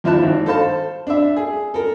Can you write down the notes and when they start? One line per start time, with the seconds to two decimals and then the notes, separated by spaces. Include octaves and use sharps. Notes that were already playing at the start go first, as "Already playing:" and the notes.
0.04 D#2 F3 E4 A5 F#6
0.22 G#1
0.46 A4 C5 F5 A5
1.07 D4 E5
1.37 G#4
1.74 A4 A#4